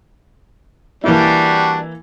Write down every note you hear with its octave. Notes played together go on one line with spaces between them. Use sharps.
E3 G3 A#3 D4 E4 F#4